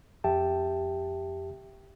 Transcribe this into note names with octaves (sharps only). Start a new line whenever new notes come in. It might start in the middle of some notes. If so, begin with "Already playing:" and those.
F2 G4 E5 G5 A5